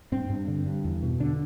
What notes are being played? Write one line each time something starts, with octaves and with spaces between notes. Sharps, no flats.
G2 C4
G2
D3
G2
E2
B2
D3 D4